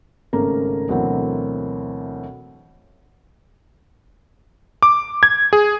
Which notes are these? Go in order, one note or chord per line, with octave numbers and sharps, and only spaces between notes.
G#1 C#3 A3 A#3 A#5
D2 B2 E3 F#3 A#3 C4
D6
G#6
G#4